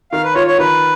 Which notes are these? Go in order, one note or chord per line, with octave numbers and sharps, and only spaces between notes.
D#3 F5
B4
F4 C#5
C#5
D#3 B4